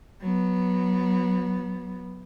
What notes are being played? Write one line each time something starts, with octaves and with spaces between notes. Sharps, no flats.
F#3 B3